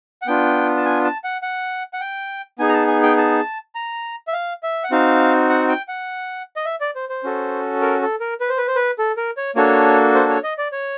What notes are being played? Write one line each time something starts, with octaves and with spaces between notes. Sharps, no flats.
F#5
B3 D4 F4 G5
A5
G#5
A5
F#5
F#5
F#5
G5
B3 D#4 G#4 G#5
A#5
A5
G#5
G5
A5
A#5
E5
F5
E5
F#5
C4 D#4 F#4 F5
F#5
G5
F#5
D#5
E5
D5
C5
C5
C#4 F#4 A4
A#4
A4
A#4
B4
C5
B4
C5
B4
A4
A#4
C#5
A#3 D4 F#4 A4 C#5
C5
C#5
D#5
D5
C#5